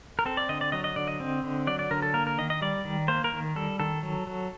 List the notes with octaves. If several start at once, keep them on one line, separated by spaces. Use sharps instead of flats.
A#4
C4 A4
D5
D3 D#5
D5
F#3 D#5
D#5
D3 D5
D#5
C4
D3
F#3 D5
D5
D3 A#4
A4
A#3 A#4
A#4
D#3 D#5
D#5
G3 D5
D#3
A#3 C5
A#4
D#3
G3 A4
D#3 A4
F#3
F#3